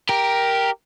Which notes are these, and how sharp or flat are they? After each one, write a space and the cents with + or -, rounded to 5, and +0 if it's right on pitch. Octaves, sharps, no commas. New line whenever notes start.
G4 +0 A#4 +5